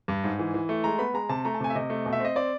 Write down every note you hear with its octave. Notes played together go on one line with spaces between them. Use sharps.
G2
G#2
E3
E3
A3
G#3 A#5
B3 B5
G#3 A#5
C3 A5
A3 A#5
A5
C3 G#5
E5
C3 D#5
A3
B2
E5
C4 D#5
C4 D5